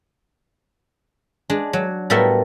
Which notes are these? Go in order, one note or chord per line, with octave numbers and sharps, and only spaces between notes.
G#3 D4
F#3
A2 G3 B3 A4 A#4 E5